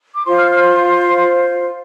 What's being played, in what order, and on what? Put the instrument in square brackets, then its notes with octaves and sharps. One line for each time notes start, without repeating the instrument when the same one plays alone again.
[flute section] D6
F4 C5 C6
F6
F6
C6